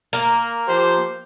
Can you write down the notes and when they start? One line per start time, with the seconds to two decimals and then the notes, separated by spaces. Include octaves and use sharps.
0.13 A#3
0.67 F3 G4 C5